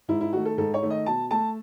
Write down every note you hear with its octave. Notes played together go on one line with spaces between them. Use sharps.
G#2 E4
E4
D#3 A3 F#4
A4
G#2 A4
C#5
D#3 A3
D#5
B2 A5
A3 A5